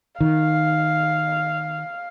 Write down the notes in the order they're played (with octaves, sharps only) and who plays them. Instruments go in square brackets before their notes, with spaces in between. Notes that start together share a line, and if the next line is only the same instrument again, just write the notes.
[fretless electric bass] D#3 [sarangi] F5